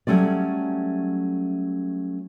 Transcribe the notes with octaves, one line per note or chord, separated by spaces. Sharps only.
F#3 G3 A3 C#4 D5